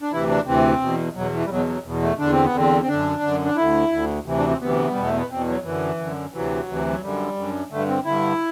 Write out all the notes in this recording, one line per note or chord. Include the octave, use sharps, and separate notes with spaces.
D4
D2 C3 E3 E4
D4
D2 C3 E3 C4
E2 B2
E2 B2 F#3
E3
G3
E2 B2 F#3
F#3
E2 B2
A3
E2 D3 D4
C4
B3
E2 D3 C4
C4
F#2 D3 D4
F#2 D3
D4
D2 D3 E4
D2 D3
D2 C3 E3
D4
C4
D2 C3 E3 B3
G3
E2 B2
A3
B3
E2 B2 C4
F#3
F#2 D3 E3
F#2 D3
D2 C3 E3 F#3
D2 C3 E3
F#3
F#2 D3 G3
F#2 D3
G2 D3 A3
C4
G2 D3 E4